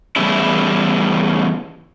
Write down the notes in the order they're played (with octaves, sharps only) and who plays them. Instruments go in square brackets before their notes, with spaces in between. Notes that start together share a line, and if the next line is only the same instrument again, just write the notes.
[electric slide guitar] E2 C#3 G3 A3 E4